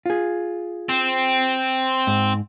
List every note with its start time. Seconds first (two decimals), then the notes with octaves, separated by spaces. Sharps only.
0.06 F4 G#4
0.89 C4
2.07 G#2